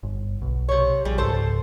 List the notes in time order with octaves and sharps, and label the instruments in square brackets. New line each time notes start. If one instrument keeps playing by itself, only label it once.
[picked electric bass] G1
B1
[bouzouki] C3 C#5
[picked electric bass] A#1 [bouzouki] G3 G#4
[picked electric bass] C#2 G#2 [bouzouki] A4 C5 A5